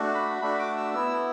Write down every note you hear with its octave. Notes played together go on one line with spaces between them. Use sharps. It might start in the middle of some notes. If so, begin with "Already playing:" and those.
Already playing: A3 D4 F#4
B5
A3 D4 F#4 B5
D6
E6
B3 E4 E6